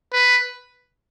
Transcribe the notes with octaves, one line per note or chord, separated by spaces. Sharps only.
B4